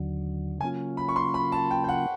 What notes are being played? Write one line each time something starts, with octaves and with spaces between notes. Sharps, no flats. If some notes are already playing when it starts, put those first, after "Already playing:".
Already playing: D#2 D3 F#3
C#3 F#3 A#3 C#4 F4 G#5
B5
C#6
C6
B5
A5
G5
G5
F#5